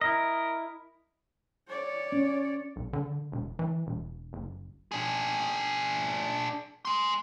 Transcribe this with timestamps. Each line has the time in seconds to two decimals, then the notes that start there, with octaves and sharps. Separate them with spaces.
0.01 E4 A#4 D#5
1.68 C#5 D5
2.12 C#4
2.76 B1
2.93 D3
3.32 E1
3.59 E3
3.87 E1
4.33 F#1
4.92 D4 G#4
6.85 G#5 C6